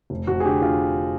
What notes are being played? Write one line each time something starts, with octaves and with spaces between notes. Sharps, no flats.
F1
F1 F#4
G#4
D3 G4
D3 F4